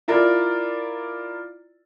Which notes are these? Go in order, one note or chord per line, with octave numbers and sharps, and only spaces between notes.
E4 F4 A#4 D5